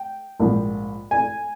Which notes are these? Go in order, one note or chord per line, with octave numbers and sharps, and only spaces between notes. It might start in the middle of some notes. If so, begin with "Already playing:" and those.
Already playing: G5
A#1 G#2 F3
G#5